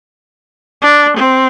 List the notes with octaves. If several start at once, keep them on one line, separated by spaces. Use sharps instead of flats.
D4
C4